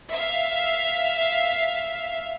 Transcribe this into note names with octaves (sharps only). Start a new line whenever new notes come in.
E5 F5